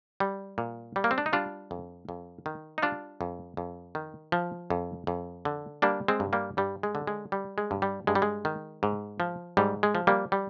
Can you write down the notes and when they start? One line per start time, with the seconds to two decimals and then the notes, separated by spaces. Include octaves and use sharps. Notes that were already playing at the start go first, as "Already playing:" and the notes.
0.20 G3
0.58 A#2
0.96 G3
1.04 A#3
1.11 C4
1.18 D4
1.26 D#4
1.33 G3 D4 F4
1.71 F2
2.09 F2
2.46 D#3
2.78 D#4
2.82 G3 D4 F4
3.21 F2
3.57 F2
3.95 D#3
4.32 F3
4.70 F2
5.07 F2
5.45 D3
5.82 G3 A#3 D4
6.08 G#3 C4
6.20 G2
6.33 G3 A#3
6.57 G2 G3
6.83 G#3
6.95 D3
7.07 G#3
7.32 G3
7.58 G#3
7.71 G2
7.82 G3
8.07 G2 G#3
8.15 G3
8.22 G#3
8.45 D#3
8.83 G#2
9.20 F3
9.57 G#2 G3
9.83 G#3
9.95 F3
10.07 G3 A#3
10.32 G3